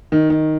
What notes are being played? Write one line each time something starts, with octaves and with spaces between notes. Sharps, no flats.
D#3
D#3